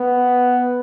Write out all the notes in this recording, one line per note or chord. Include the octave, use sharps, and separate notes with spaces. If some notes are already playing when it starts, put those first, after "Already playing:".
Already playing: B3